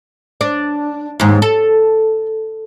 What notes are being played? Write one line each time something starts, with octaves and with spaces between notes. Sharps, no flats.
D4
D#2 G#2
A4